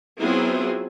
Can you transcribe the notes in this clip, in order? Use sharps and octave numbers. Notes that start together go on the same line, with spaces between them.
F#3 B3 C4 E4 F4 G#4